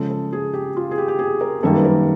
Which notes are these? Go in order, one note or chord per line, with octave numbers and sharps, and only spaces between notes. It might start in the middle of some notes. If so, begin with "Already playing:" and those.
Already playing: C#3 F3 G#3 A4
A4
G#4
G4
F4
G#4
G4
G4
G#4
A#4
F#2 D#3 G3 A#3 A4
B4
A#4